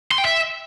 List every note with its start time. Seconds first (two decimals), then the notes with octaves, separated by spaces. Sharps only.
0.11 C6
0.18 G5
0.25 E5